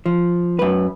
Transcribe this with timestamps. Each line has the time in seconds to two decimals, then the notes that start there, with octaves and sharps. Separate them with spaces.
0.06 F3
0.59 F#2 B4